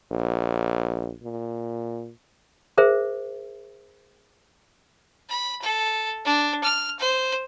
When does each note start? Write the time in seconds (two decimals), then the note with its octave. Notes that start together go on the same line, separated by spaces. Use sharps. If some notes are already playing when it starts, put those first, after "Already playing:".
0.11 A#1
1.23 A#2
2.78 G#4 A#4 C5 E5
5.29 B5
5.62 A4
6.25 D4
6.64 F6
6.99 C5